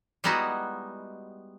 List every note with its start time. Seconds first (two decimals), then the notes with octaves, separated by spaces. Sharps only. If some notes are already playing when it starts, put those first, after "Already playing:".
0.24 G3 G#3 B3 D#4 E4 F#4